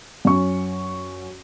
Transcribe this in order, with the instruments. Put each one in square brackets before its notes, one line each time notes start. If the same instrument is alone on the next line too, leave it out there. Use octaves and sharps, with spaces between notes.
[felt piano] F#2 C#4 C#6